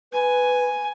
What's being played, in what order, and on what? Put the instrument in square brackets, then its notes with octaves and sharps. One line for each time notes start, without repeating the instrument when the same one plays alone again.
[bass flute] B4 [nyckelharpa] G#5